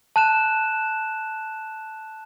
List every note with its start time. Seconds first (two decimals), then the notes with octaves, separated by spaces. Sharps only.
0.16 A5 F#6 E7